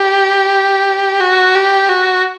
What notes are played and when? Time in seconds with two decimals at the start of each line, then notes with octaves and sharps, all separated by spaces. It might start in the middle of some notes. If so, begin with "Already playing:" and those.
Already playing: G4
1.20 F#4
1.55 G4
1.89 F#4